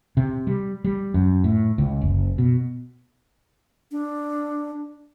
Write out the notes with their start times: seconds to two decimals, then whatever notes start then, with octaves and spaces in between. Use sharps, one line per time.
0.17 C3
0.47 G3
0.84 G3
1.14 F#2
1.44 A2
1.78 C#2
2.01 F#1
2.38 B2
3.92 D4